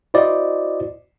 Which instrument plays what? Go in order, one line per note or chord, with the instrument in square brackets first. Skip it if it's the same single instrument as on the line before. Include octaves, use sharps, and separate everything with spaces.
[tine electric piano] E4 F#4 C5 D5 D#5